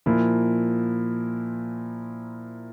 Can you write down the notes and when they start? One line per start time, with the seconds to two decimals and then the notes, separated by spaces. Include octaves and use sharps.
0.06 A#2 F3 A#3 E4